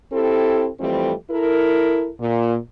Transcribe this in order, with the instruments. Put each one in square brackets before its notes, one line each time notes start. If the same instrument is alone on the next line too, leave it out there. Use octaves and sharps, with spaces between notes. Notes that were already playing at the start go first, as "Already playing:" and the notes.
[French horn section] C4 E4 G4 A4
F2 E3 G3 A3 C4
E4 A4 A#4
A#2